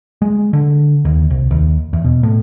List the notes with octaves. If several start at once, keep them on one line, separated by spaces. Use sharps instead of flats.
G#3
D3
D#2
C2
D#2
E2
B2
A2